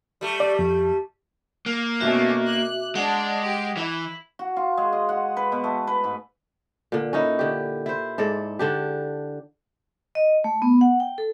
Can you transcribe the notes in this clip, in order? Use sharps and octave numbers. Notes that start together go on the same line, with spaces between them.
G3 A3
D5
F2
A#3
B2 A3 C#4 F#4 E5 D6
F#6
G#3 D4 F#5 D6
G4
E3 E4
F#4
F4
G#3
D#5
F#5
B4
B2
A3
B4
G#2
A#2 D3
C#4 D#4 E4
D3 G4
E4 C5
G#2 A4 D5
D3 D4 G4
D#5
A3
B3
F#5
G5
A4